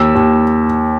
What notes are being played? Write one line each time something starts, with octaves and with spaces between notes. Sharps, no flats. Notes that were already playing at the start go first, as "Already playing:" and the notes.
Already playing: D#2 E6
D#2